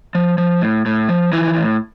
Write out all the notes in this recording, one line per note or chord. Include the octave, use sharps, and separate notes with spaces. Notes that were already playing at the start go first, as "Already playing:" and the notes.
F3
F3
A2
A2
F3
E3 F3 E4
A2